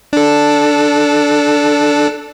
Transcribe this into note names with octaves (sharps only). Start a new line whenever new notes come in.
D4 A4